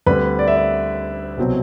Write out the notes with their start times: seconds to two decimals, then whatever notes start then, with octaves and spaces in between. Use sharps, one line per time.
0.06 D2 D3 G3 C4 B4 B5
0.39 D5
0.48 E5
0.56 D5
1.38 C2 B2 F#3 C4